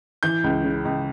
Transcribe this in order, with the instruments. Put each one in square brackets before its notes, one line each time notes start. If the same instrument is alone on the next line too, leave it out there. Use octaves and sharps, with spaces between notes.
[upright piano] E3 G6
C#2
C#3
C#2